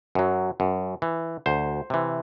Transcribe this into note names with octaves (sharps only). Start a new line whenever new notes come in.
F#2 F#3
F#2
E3
D2 C5
C3 E3